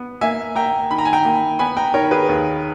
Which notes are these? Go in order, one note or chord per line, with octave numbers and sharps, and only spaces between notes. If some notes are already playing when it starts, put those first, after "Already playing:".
Already playing: B3
A#3 E5 G#5
A#3 G5 A#5
D#3 B5
A#5
G#5
G5 A#5
A#3
B3 G#5 B5
G5 A#5
D#3 A#4 C#5
G#4 B4
D#2